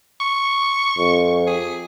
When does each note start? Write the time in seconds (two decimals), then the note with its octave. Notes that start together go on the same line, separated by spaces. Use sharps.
0.21 C#6
0.97 F2
1.47 G#4